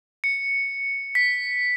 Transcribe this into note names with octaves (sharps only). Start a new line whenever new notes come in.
C#7
B6